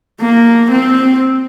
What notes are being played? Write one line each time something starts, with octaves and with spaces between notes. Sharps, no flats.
A#3
C4